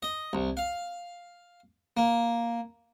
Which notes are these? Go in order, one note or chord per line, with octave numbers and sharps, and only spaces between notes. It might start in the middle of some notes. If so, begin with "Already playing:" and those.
D#5
C2
F5
A#3